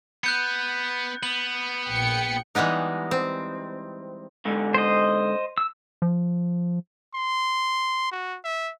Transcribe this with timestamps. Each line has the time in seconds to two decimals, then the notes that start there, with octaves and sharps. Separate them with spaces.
0.24 B3 F#6 G6 C#7
1.23 B3 F#7
1.88 A#1 G5 C#7
2.55 E3 G3 G#3 B3 D#4
3.11 C4
4.45 G#2 D3
4.74 C5 D#5
5.58 E6
6.02 F3
7.15 C6
8.11 F#4
8.44 E5